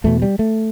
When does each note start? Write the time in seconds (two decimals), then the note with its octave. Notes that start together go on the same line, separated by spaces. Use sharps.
0.04 E2 B2 A3
0.22 G3
0.39 A3